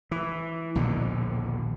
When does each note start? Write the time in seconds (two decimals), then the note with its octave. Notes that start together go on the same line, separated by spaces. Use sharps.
0.11 E3
0.75 A#1 D#2 B2 D3